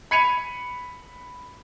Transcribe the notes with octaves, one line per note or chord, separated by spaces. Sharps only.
B5 G#6 C#7 D#7 F7